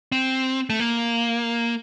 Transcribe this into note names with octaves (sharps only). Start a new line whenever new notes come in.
C4
A3
A#3